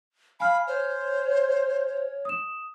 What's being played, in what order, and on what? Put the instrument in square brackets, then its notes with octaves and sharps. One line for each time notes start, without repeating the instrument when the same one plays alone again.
[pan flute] F5 [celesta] G#5 F6 [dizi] B5
[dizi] C5 [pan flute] C#5
[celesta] D#6 E7